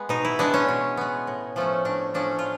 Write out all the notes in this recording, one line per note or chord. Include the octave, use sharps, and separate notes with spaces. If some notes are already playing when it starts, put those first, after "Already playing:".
Already playing: G#3 B3
B2 D#4
E4
G#3 B3 D4
C#4
B2
G#3 B3
A2
F3 A3 C#4
A2 D4
F3 A3 C#4 D4
F4